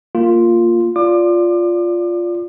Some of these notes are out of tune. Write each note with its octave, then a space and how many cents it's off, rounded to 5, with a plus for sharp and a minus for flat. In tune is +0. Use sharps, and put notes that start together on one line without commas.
A#3 -10 F4 +0
F4 +0 D5 -15 D6 +35